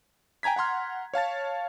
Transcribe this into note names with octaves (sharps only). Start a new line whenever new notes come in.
G5 G#5 A#5 G#6 B6
F#5 A#5 C6 F6
C#5 F5 A5 A6